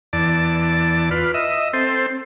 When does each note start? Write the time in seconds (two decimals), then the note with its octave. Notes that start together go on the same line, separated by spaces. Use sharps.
0.13 E2 D5 A5
1.11 F4 B4
1.34 D#5 E5
1.73 C4 A4 C5